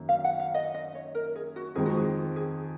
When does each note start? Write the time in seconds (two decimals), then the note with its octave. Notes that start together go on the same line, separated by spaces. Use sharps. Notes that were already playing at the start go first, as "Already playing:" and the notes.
Already playing: F#2 D#3 A#3
0.09 F5
0.24 F#5
0.40 F5
0.54 D#5
0.74 D#5
0.95 C#5
1.15 A#4
1.36 G#4
1.56 F#4
1.75 F2 D#3 G#3 C4 G#4
1.86 F#4
1.97 G#4
2.36 G#4